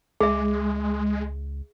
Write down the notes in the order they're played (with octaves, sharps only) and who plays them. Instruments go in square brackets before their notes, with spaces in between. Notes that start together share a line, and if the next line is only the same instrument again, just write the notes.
[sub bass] C#2 [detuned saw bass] G#3 [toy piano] G#4 E5